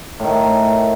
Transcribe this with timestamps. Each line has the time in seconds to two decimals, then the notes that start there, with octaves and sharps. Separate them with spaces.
0.20 A2 D#3